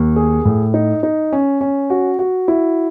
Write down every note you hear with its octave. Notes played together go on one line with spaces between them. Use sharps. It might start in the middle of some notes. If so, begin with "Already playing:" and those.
Already playing: D#2
G#4
A2
D#4
D#4
C#4
C#4
F#4
F#4
E4